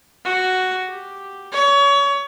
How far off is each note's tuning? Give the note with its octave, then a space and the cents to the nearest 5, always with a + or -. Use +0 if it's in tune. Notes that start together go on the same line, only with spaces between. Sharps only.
F#4 +5
G4 +0
C#5 +30